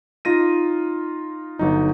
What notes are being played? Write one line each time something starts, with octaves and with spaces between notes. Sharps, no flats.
D#4 F4 A#6 D#7
G1 F#3 D#4